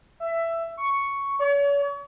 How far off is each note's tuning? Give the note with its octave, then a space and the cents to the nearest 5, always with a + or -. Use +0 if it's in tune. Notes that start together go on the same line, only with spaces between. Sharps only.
E5 +15
C#6 +0
C#5 +40